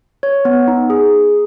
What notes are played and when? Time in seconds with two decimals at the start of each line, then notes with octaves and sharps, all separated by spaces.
0.23 C#5
0.45 B3
0.68 D#4
0.90 G#4